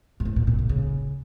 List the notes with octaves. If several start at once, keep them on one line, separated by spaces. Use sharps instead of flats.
G#2
A2
A#2
A#2
D3
C#3